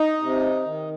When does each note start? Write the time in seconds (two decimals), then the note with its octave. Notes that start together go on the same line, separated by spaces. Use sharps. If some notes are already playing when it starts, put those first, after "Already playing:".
Already playing: D#4
0.22 C3
0.65 D#3